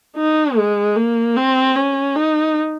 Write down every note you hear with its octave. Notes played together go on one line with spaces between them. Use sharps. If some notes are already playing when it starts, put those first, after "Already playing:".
D#4
G#3
A#3
C4
C#4
D#4